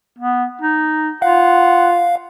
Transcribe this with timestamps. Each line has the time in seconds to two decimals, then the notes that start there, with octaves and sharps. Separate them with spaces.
0.19 B3
0.61 D#4
1.22 F4 F5 F#5